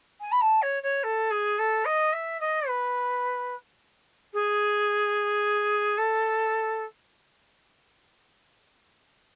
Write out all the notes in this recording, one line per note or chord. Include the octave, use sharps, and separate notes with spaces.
G#5
B5
A5
C#5
C#5
A4
G#4
A4
D#5
E5
D#5
B4
G#4
A4